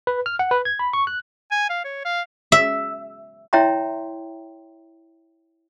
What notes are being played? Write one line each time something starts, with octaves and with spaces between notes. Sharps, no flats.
B4
F6
F#5
B4
G#6
B5
C#6
F#6
G#5
F5
C#5
F5
E5
E4 C#5 E5 G5 A#5 C6